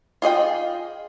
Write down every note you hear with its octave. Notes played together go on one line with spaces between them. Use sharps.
F4 G#4 D#5 G5